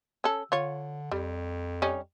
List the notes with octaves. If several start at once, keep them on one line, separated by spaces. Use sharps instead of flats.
C#4 A4
D3 F4 C#5
F2 G3
G3 C#4 D#4